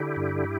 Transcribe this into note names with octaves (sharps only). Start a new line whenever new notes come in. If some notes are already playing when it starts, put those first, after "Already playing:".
Already playing: D3 E4 G4
G2